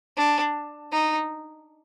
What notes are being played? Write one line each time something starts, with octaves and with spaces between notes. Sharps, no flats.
D4
D#4